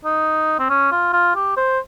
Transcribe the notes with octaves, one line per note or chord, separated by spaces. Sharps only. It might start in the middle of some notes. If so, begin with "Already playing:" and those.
D#4
C4
C#4
F4
F4
G4
C5